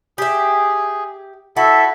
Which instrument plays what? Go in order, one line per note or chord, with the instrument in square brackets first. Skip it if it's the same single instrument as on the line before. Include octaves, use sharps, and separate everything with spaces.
[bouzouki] G4 E5 [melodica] G#4
[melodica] E4 A4 E5 [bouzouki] F#4